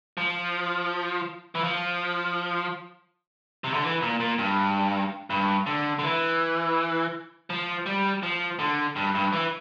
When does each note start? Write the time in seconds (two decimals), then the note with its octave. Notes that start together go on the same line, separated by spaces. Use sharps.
0.18 F3
1.55 E3
1.64 F3
3.64 C3
3.74 D3
3.84 E3
4.02 A#2
4.20 A#2
4.38 G2
5.30 G2
5.66 D3
5.99 D3
6.03 E3
7.50 F3
7.86 G3
8.23 F3
8.59 D3
8.96 G2
9.15 G2
9.33 E3